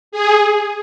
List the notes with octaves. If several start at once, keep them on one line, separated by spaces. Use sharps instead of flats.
G#4